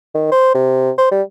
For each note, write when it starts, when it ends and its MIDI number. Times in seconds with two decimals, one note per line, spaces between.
0.15 0.30 51
0.32 0.54 72
0.54 0.91 48
0.98 1.07 72
1.12 1.22 55